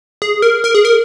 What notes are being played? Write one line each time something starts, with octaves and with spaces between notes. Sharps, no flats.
G#4
A#4
A#4
G#4
A#4